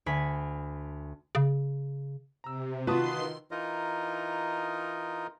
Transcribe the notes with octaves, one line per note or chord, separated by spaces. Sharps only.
D2 G#5 B5 B6
C#3
C3 A#5 E6
D#3 F4 F#4 B4 A5 C6 D#6 C7
E3 D#4 F4 A#4 D#5